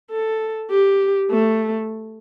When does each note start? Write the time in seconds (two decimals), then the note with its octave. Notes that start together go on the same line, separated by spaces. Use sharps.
0.11 A4
0.70 G4
1.30 A3